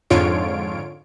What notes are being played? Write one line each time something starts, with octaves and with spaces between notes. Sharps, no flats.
F2 G#2 D3 F4 C#5 D7